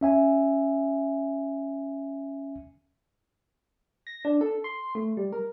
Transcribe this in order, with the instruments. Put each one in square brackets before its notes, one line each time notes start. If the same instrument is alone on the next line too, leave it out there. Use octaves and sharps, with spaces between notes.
[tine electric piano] C#4 E5 G#5
[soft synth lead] A#6
D4
A4
C6
A3
G3
A#4